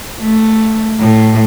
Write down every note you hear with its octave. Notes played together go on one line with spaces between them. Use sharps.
A3
A2